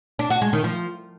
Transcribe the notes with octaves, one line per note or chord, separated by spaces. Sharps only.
D4
F#4
G#3
D#3
F3